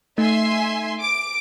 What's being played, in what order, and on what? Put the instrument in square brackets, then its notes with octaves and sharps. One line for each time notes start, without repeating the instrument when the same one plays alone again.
[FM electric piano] A3 D#4 [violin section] E5 G#5 C6
[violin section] D6 D7